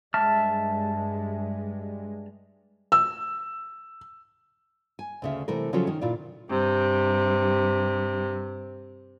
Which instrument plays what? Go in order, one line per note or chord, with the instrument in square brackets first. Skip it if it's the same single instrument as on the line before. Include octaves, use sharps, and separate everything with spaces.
[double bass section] G2 G#3 [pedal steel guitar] E5 A5 F6
[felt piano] E6
[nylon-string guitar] G#5
D2 C#3 E5
C3 E3 A3 A4 A#4
C#3 F3 F#3 C#4 F4 A4
D#3 C#4
A#2 E4 F4 D5
[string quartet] G2 C3